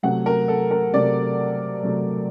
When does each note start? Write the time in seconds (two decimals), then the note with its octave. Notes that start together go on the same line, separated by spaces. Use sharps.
0.03 C3 F#3 A3 F#5
0.26 A#4
0.48 A4
0.71 A#4
0.93 C3 F#3 A3 D5
1.83 C3 F#3 A3